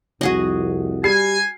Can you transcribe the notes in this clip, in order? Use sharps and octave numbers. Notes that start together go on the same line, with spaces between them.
C2 F2 F#4 G#4 D#5
G3 G#5 C7